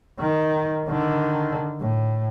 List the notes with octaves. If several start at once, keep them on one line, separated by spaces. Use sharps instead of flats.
D#3
D3 D#3
A2